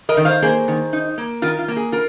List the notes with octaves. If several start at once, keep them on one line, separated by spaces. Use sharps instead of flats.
A#4 D#5
D#3
C5 F5
A#3 G#4 C5
D#3
D#4
A#3
D#3 F4 A#4
F4
A#3
G#4
F4 A#4